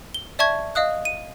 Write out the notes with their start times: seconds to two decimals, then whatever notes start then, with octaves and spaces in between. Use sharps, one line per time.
0.14 G7
0.39 D5 E5 A5 C#6 G#6
0.75 D#5 F5 D#6 F#6
1.05 D#7